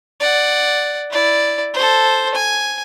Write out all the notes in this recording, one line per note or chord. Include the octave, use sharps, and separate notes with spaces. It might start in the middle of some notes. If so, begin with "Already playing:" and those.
D5 F#5
E4 D5
A4 C5
G#5